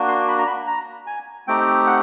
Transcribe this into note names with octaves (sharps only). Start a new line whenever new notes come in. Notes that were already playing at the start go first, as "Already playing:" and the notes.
Already playing: A#3 D4 F#4
C6
B5
A#5
B5
A#5
G#5
A3 C4 D#4 G4 G5
F#5